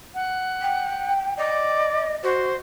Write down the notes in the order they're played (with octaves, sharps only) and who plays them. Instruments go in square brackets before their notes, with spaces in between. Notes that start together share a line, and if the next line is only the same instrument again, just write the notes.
[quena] F#5
[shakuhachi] G5
[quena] D5 [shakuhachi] D#5
[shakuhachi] F#4 [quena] C5